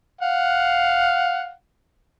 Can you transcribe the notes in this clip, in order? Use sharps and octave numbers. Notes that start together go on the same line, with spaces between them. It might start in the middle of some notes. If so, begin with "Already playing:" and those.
F5 F#5